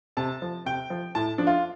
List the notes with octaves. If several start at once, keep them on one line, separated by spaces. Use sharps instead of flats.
C3 A5
F3
C3 G5
F3
A2 A5
F3 D4
F4